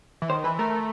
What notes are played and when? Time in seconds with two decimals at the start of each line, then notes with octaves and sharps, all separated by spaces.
0.22 E3
0.29 D#3 C5
0.44 E3 B4
0.59 A3 A#4